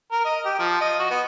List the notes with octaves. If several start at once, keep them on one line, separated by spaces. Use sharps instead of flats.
A#4
D#5
G4
F3
D#5
F#4
B3